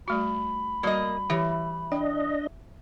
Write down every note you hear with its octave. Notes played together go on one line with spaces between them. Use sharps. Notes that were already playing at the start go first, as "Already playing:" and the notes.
G3 A3 F#4 B5
G3 A#3 F#4 D#5
E3 G4 C#5
D4 D#5 G5